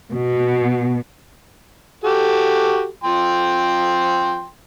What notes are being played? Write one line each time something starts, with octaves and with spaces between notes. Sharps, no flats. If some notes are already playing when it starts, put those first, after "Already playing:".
B2
F#4 G4 A4
F3 G5 C6